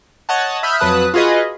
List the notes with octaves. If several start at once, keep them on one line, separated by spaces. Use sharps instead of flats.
C#5 D#5 F#5 A5
E5 B5 D#6 F6 G6
F2 F#3 B4 A5 D#6 F#6
F4 F#4 G#4 B4 D#5